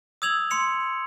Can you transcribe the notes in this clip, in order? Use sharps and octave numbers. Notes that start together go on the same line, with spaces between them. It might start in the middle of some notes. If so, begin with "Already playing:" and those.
D#6 E6 G#6 F7 F#7
C6 C#7 F7